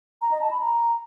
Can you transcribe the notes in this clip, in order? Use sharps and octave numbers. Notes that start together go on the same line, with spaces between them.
A#5
D#5
A5
B5
A#5